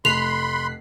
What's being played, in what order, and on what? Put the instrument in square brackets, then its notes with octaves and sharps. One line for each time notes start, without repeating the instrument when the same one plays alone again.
[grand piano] F1 A3 [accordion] B5 C6 [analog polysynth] F#6 B6 C7 [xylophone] F7